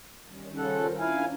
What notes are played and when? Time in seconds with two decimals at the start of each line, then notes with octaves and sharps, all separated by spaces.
0.23 D#3 G3 C#4
0.57 C#3 F4 A4 A#4 C5 F#5
0.99 C#4 D4 E4 F5 G#5